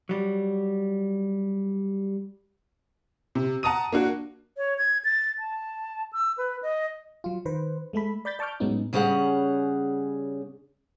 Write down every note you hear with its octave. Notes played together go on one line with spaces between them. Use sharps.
F#3 G3
C3
F#5 A5 A#5 D#6 D#7
A#3 D4 F#4
C#5
G#6
A6
A5
E6
B4
D#5
F#3 F4
D#3 B4 C5
G#3 A3 A4 B5
D5 B5 G6 A6 B6
D5 A5 C#6 D6 F6 G6
A2 F#3 G#3 B3 C#4 D#4
C#3 G3 C#4 G#4 F#5